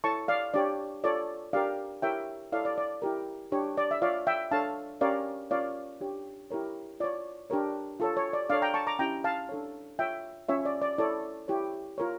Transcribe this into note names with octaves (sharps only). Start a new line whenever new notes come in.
E4 A4 C#5 A5 C#6
D5 F5
D4 G4 C#5 D5
F4 A4 C#5 D5
D4 G4 A#4 D5 F5
E4 G4 A#4 C#5 E5 G5
E4 A4 C#5 D5 F5
D5
D5
E4 G4 A#4
D4 G4 C#5
D5
E5
F4 C#5 D5 F5
E5 G5
D4 A4 C#5 F5 A5
C#4 G4 A#4 C#5 D5 F5
C#4 F4 A#4 C#5 D5 F5
D4 G4 C#5
E4 G4 A#4 C#5
F4 C#5 D5
D4 G4 A#4 C#5
F4 A4 C#5
C#5
D5
D4 A4 C#5 D5 F5
G5 A#5
A5 C#6
A#5 D6
C#4 E4 G4 G5 A#5
F5 A5
D4 A4 C#5
F4 C#5 E5 G5
C#4 F4 C#5 E5
D5
D5
E4 A4 C#5 D5
E4 G4 C#5
F4 A#4 C#5